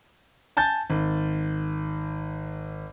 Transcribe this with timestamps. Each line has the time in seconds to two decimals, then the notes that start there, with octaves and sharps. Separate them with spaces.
0.57 G#5 A5 G6 A6
0.90 G#1